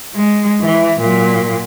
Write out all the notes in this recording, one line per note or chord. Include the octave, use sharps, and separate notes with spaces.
G#3
E3
A#2 F#3